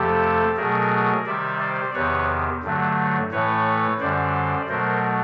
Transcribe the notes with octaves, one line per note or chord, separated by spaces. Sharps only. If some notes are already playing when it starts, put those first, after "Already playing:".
Already playing: F2 C3 F3 A3 G4 A4
B2 F#3 A3 G#4 A#4
C3 D#3 G3 D5 E5
C5 D5
E2 C3 D#3 B4 C#5
G2 D3 F#3 A3
A2 E3 A3 B4 C#5
F#2 D3 G3 C5 D5
B2 F#3 A3 A#4 C5